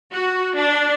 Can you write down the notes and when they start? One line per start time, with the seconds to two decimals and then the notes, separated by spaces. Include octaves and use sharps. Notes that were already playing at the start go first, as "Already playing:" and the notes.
0.12 F#4
0.55 D4